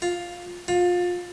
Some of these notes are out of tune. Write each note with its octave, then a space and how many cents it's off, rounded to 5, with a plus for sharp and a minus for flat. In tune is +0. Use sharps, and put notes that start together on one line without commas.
F4 +5
F4 +25